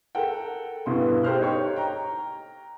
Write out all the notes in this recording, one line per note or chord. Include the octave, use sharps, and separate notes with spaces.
A4 A#4 F#5 G5
G2 B2 E4 B4 C6
G4 A4 C5 F6 F#6
D#4 G4 C#5 C#6
G5 A#5